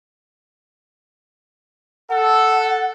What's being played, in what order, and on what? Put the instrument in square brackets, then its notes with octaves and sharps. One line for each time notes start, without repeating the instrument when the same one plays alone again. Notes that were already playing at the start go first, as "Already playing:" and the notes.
[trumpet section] A4 [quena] F#5